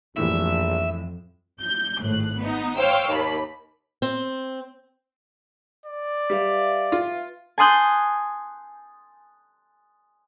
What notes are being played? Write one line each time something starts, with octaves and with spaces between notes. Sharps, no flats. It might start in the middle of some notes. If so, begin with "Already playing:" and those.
A#1 F2 A2 E3 G3 E5
G6
G#1 A2 F#6
B3 D#4
C5 C#5 F5 G5 E6
D#2 B5
C4
D5
G3 B4 E5 F5
F4
G#5 A5 C6 D#6 F#6 G6